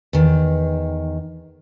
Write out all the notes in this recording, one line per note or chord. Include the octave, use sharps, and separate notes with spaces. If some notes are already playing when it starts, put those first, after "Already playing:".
E2 D#3